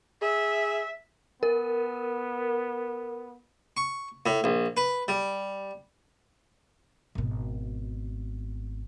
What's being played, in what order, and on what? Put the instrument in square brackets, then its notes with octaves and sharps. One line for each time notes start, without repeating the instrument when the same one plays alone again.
[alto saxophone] G#4 [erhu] E5
[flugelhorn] B3 [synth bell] A#4
[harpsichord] C#6
A2
A#1
B4
G3
[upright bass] G#1 B2